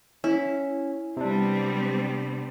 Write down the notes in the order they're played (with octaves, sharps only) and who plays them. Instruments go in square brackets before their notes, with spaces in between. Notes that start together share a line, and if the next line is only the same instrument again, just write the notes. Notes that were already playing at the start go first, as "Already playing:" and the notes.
[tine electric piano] C#4 [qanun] E4
[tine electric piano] C3 D4 [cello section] G3 B3 C4